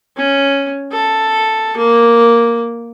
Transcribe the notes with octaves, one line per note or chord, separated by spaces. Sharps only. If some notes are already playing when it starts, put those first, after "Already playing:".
C#4
A4
A#3